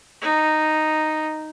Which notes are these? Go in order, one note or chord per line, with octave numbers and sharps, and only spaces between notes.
D#4